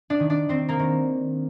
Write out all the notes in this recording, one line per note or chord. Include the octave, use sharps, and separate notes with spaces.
D4 D5
D#3
D4 D5
D#3 C4 C5
A#3 A#4
D#3